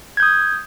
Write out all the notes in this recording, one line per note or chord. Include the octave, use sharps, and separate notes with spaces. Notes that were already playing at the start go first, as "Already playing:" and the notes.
D#6 G6 G#6